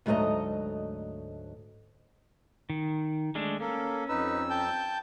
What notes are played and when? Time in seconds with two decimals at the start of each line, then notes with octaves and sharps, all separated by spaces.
0.06 D2 G#2 F#3 A3 D#5 A#5
2.70 D#3
3.35 G#3 A3 D4
3.60 A#3 C#4 A4
4.09 F2 D#4 B4 E6
4.50 G5 A5 G6